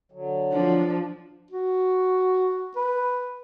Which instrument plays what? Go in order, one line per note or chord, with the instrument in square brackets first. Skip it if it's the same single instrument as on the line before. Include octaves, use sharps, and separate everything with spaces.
[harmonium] D3 F#3
[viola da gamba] F3 [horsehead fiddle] D4
[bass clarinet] F#4
B4